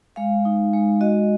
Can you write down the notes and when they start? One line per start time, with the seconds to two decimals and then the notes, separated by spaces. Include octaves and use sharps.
0.16 G#3 F5
0.45 D#4
0.73 G#3
1.01 F#4 D#5